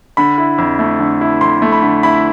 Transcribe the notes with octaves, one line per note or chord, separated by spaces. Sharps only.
D3 B5
E4
F2
A3
D3
E4
F2 C6
A3
B5
D3
E4 B5